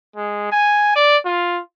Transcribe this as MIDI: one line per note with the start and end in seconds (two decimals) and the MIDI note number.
0.16 0.51 56
0.52 0.92 80
0.96 1.17 74
1.26 1.61 65